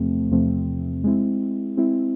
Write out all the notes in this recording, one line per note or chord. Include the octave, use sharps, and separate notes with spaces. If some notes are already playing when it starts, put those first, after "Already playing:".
Already playing: E2 C3 F3 A3 C4
E2 C3 F3 A3 C4
G#3 C4 E4
G#3 C4 E4